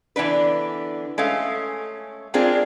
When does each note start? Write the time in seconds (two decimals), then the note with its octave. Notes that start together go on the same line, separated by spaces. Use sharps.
0.16 D3 E3 B3 D4 B4
1.18 G#3 A3 C#4 F5
2.34 G#3 A#3 C4 D4 F4 G#4